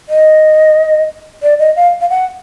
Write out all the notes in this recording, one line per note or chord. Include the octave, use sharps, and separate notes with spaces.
D#5
D5
D#5
F5
F5
F#5